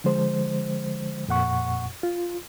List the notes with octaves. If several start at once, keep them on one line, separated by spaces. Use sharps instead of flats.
D3 F3 G#3 C5
F2 A#2 F#5 C#6
F4